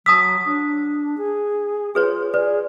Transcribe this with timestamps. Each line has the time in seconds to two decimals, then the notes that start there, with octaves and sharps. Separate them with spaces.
0.06 F#3 A5 D#6 E6 B6
0.45 D4
1.18 G#4
1.95 F4 G#4 B4 C#5
2.34 G#4 B4 D5